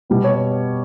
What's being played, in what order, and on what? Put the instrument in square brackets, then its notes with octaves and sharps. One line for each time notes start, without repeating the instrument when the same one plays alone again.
[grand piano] B2 G3 B3
C#5